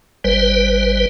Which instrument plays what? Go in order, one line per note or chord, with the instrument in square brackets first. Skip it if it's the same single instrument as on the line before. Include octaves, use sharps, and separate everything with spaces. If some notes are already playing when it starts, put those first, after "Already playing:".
[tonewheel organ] G#1 G3 B4 C5